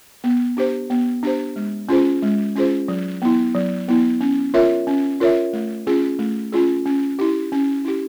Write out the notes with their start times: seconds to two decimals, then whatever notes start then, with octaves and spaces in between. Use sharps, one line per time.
0.24 B3
0.57 D4 G4 C5
0.90 B3
1.23 D4 G4 C5
1.56 G#3
1.89 C#4 F4 G#4 C5
2.22 G#3
2.56 C#4 F4 G#4 C5
2.88 F#3
3.22 B3 E4
3.55 F#3
3.88 B3 E4
4.21 C#4
4.54 F4 A#4 C#5 E5
4.87 C#4
5.20 F4 A#4 C#5 E5
5.53 A3
5.87 C#4 F4 G#4
6.19 A3
6.52 C#4 F4 G#4
6.85 C#4
7.19 E4 G4
7.52 C#4
7.85 E4 G4